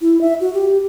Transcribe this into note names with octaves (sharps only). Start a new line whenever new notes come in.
E4
E5
F#4
G4